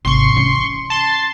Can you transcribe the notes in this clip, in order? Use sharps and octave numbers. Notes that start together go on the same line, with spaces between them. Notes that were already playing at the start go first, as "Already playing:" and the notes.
G#1 C3 C6 C#6
E3 C#4
A5 C6